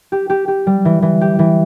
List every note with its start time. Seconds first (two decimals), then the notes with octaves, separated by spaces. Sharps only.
0.12 G4
0.30 G4
0.48 G4
0.67 G3
0.85 E3
1.02 E3
1.21 G4
1.39 E3